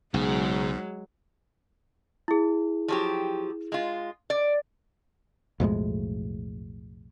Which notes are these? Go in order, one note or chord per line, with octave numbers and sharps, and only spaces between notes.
B1 G#2 C#3 F#3 G#3
E4 G#4
F3 F#3 G4
G#3 F4
D5
B1 F2 A2 G#3